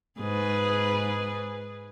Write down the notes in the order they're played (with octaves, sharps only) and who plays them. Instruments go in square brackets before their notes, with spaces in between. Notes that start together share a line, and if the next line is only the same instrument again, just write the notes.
[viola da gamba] G#2 G#4 B4